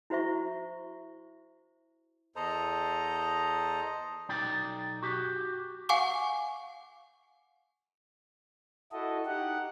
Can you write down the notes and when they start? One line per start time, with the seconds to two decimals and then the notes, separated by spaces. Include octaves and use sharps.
0.10 E4 F#4 C5 E5 C#6
2.36 E2 A4 C5 D#5 A#5
4.29 B1 D#4 D5 G5
5.02 F#4 G4
5.89 F5 F#5 G#5 C#6 D6
8.92 E4 F#4 A4 D#5
9.26 D#4 G4 F#5